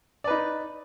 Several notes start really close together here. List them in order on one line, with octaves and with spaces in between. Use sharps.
D5 B4 D#4